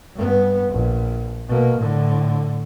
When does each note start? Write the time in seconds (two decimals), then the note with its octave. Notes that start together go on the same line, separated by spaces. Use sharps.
0.15 G2 B3
0.69 A#1
1.48 B2 A#3
1.78 A2 D3